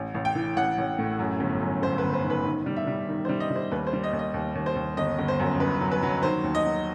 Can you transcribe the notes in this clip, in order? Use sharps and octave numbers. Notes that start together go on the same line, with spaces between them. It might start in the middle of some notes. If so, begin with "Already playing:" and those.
Already playing: A1
A1
G5
E3
A1 F#5
A1
A2
F#2
G1
F#2
G1 C5
B4
G1
C5
D#3
B4
D#3
G3
E5
G3
D#3
C5
G3
D#5
G3
C5
D#2 B4
C5
G3
D#5
D#2
D#5
D#2
D#2
C5
D#2
G1 D#5
G1
C5
F#2
G1 B4
F#3
B4
F#3
D#3 C5
D#2
D#5
F#3